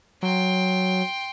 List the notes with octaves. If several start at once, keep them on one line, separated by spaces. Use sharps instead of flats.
F#3 G5 C6